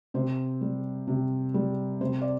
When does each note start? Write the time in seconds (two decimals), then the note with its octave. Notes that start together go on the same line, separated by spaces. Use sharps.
0.14 C3 C5
0.61 G3
1.07 C3
1.54 G3
2.01 C3 C5
2.22 D5